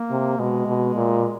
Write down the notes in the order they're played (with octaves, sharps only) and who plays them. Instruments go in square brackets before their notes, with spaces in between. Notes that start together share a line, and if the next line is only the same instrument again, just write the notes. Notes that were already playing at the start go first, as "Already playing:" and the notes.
Already playing: [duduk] A#3
[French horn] C3
[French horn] B2 [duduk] G#3
[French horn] B2
A#2